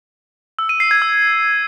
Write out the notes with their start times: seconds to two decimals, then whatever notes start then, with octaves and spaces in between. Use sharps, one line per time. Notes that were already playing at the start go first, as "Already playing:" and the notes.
0.59 E6
0.69 D#7
0.80 C7
0.91 G#6
1.02 E6